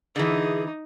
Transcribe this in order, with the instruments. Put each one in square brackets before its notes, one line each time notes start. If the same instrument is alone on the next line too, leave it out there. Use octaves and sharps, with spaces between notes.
[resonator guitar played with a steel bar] D3 E3 [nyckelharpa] D#4 [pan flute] G#4